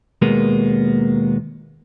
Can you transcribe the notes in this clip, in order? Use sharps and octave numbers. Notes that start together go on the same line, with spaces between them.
D#2 B2 G#3 A#3 B3